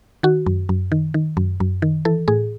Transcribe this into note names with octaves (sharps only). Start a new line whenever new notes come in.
D#3 F#4
F#2
F#2
D#3
D#3
F#2
F#2
D#3
E3 A4
A2 G#4